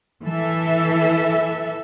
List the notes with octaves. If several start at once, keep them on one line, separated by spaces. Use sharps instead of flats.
E3 A4 E5